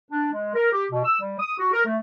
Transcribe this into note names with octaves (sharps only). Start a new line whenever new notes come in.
D4
G#3
A#4
G4
B2
E6
G3
D#6
F#4
A#4
A3